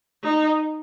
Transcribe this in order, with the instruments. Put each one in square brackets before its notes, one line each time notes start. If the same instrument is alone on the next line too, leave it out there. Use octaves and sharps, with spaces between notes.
[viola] D#4